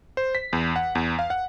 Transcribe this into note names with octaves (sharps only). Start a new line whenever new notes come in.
C5
B6
E2
F#5
E2
F5
F#5